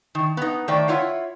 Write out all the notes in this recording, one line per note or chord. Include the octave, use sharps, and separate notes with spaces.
D#3
B3 D#4
D#3 A3 C5 D5 G5
E4 F4 C#5 F#5